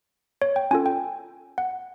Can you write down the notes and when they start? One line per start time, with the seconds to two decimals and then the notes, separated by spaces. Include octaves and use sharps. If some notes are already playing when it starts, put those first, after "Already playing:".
0.42 C#5
0.56 G5
0.71 C#4 F4 A4 G#5
0.86 G5
1.58 F#5